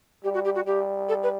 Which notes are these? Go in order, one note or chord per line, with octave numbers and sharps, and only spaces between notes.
G3 G4
F#4
G4
F#4
G3 G4
A4
B4